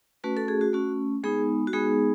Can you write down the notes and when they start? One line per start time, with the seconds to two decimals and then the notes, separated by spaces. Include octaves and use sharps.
0.24 A3 C#4 F#4 B4
0.37 A4
0.48 G#4
0.61 F#4
0.73 A3 C#4 F#4
1.24 G#3 B3 D#4 G#4
1.67 F#4
1.73 G#3 B3 D#4 G#4